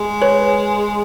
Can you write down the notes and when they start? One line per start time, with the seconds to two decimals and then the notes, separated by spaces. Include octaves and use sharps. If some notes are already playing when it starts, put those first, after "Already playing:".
Already playing: G#3
0.22 B4 C#5